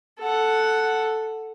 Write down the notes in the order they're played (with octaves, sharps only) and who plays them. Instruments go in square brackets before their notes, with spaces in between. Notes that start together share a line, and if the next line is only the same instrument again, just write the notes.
[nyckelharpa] A4 F#5